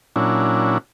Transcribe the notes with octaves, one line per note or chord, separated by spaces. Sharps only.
A#2 F#3 C#4 D4 E4